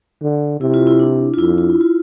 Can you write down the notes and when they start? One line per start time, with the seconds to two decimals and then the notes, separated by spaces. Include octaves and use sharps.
0.22 D3
0.60 C3 E4
0.74 F4
0.87 E4
0.99 D4
1.34 F4
1.39 F2 E4
1.58 F4
1.69 E4
1.81 F4